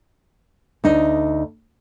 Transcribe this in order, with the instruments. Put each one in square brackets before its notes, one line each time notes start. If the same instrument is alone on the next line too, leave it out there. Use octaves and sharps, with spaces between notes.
[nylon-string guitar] D2 D4 D#4